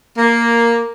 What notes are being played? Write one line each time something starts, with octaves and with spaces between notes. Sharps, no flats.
A#3